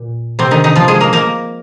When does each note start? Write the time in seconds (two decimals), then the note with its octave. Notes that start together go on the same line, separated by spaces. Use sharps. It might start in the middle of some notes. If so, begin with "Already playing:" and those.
Already playing: A#2
0.39 C3 C4
0.51 D#3 D#4
0.64 D#3 D#4
0.76 F3 F4
0.88 G#3 G#4
1.01 A#3 A#4
1.13 A#3 A#4